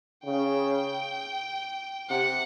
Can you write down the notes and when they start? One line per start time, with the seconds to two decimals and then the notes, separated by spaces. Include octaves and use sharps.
0.24 C#3 G5
2.10 C3 F#5